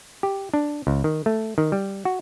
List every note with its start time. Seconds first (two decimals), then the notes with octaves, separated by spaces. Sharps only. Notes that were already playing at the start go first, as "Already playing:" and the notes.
0.23 G4
0.54 D4
0.87 C#2
1.04 D#3
1.26 A3
1.58 D#3
1.72 G3
2.05 F#4